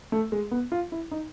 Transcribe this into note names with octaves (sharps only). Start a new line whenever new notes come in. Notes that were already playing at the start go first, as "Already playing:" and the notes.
A3
G#3
B3
F4
E4
D#4